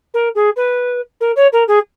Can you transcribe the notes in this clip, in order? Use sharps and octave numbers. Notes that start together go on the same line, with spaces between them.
A#4
G#4
B4
A#4
C#5
A#4
G#4